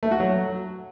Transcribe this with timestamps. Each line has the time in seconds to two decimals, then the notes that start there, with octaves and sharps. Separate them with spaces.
0.03 A3
0.11 F#4
0.20 F#3